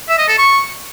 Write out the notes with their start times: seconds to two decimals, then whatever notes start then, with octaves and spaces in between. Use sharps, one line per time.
0.09 E5
0.18 D#5
0.28 A4
0.38 C#6